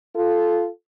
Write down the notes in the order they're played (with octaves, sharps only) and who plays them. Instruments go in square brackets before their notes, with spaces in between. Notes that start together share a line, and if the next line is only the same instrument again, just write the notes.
[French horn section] F4 A4